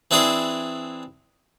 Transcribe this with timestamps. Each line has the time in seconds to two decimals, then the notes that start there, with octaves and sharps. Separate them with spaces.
0.11 E3 C4 D4 E4 G#4 C5